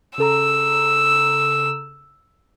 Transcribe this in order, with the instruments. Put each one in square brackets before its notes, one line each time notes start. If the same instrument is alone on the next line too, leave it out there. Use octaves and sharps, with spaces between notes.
[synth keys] C#3 A4 A#5 [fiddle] E6